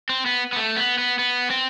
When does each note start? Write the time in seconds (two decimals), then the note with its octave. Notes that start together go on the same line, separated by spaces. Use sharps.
0.09 C4
0.26 B3
0.52 B3
0.56 A3
0.76 B3
0.98 B3
1.19 B3
1.50 C4